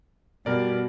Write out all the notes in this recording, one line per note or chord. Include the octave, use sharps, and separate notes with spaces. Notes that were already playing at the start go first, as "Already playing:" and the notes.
B2 G3 A#4 D5